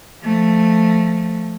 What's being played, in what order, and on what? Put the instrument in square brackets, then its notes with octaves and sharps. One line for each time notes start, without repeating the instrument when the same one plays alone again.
[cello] F3 A3